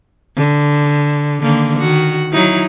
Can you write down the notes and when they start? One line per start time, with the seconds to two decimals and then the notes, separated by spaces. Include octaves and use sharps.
0.36 D3
1.42 D3 D#3 A#3
1.79 D#3 F#4
2.31 F#3 D#4 E4